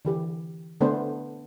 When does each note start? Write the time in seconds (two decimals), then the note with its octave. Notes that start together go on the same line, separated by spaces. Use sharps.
0.05 D3 E3 G4
0.81 D3 A3 B3 D4 B4 C5